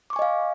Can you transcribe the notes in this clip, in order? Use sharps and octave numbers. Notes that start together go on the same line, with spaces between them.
D#5 F5 G#5 C#6 D6